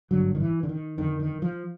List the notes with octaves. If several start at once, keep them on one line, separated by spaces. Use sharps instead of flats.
G#1 G2 D3 F#3
D#3
E3
D3
D#3
F1 F2 D3 D#3
D#3
F3